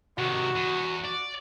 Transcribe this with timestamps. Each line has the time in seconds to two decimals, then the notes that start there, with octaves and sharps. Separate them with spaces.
0.18 C3 D#3 F#4
0.56 E2
1.04 D5